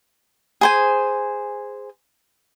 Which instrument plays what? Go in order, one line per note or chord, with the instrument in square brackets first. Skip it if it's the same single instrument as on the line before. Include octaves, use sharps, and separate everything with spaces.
[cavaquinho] G#4 C5 G#5